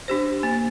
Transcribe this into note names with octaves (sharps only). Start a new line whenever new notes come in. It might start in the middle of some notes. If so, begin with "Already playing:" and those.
D4 G4 C5
A#3